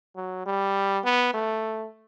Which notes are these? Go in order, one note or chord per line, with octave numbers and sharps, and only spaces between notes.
F#3
G3
B3
A3